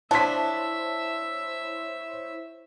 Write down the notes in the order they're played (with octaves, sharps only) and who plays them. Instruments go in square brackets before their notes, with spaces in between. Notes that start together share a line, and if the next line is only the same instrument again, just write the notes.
[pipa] F3 D4 [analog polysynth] E4 C5 C#5 [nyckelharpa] E5 [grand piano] A5 B6